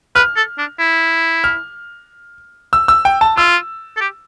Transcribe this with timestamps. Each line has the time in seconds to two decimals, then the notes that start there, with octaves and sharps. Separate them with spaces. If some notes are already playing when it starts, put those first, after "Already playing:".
0.15 B4 F6
0.36 A4
0.58 D4
0.79 E4
1.44 F6
2.73 E6
2.88 E6
3.05 G5
3.21 A5
3.37 F4 E6
3.97 A4
4.01 G4